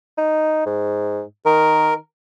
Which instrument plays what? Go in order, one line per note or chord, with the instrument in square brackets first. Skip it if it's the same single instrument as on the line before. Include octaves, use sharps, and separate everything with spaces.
[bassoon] D#4
G#2
[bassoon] D#3 [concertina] A#4